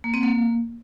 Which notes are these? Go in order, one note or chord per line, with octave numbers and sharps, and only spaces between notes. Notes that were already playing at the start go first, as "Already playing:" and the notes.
A#3
C4
A#3